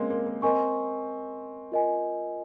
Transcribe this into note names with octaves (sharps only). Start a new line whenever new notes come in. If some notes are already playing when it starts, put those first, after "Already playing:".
Already playing: G#3 A#3 C4 C#4
A#3
A#3
C4 A#4 D#5 G#5 C#6
F4 A#4 D#5 G#5